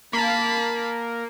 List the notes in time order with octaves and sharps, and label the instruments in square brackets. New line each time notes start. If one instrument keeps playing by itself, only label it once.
[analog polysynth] A#3 [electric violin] A5 B5